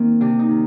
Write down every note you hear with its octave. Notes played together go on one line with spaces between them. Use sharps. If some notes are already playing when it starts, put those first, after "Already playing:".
Already playing: D#3 A#3 C4
C3 D4
D#4
D#3